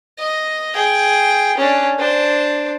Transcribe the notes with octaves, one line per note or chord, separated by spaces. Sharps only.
D#5
G#4 G5
C#4 D4
D4 C5